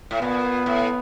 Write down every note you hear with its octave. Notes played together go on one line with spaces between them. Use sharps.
A2
A#2 B3
A2